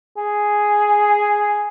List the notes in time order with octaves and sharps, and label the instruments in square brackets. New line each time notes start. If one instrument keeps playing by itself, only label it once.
[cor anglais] G#4